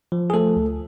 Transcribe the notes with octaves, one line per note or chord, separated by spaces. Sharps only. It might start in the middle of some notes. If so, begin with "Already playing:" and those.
F3
G#4
F3 A3 A4
D2